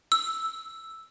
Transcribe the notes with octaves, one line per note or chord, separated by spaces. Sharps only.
E6